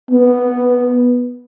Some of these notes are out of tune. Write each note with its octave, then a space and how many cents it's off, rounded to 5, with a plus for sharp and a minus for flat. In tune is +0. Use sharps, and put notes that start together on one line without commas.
B3 -5